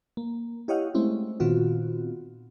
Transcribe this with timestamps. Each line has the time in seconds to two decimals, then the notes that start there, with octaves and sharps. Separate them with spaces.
0.17 A#3
0.68 E4 G4 C#5 D#5 F5 F#5
0.94 G#3 A3 C4 C#4 E4
1.40 A#2 D#3 B3 C4 F4 F#4